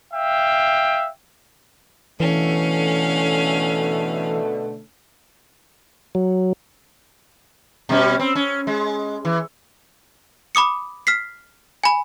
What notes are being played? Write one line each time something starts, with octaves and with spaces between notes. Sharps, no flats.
E5 F5 G5
B2 D3 E3 A3 C#4 F5
F#3
B2 G3 C#4
C4
C#4
G#3
E3
B5 D6 D#6 C#7
F6 B6 C7
G#5 B5